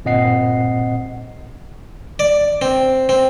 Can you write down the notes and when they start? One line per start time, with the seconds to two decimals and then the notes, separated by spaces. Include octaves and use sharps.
0.05 G1 A#2 C4 D#5 F#5 C7
2.19 D5
2.62 C4
3.09 C4